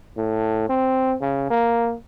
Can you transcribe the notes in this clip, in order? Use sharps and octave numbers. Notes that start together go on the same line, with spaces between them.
A2
C4
C#3
A#3